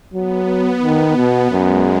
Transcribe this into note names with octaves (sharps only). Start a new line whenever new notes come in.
F#3 B3
D#3
B2
F#2 G#3